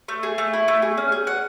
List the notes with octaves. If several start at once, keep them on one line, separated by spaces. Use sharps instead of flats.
A3
G#4
A3
E4
A3
G#4
C#4
G#4
F#5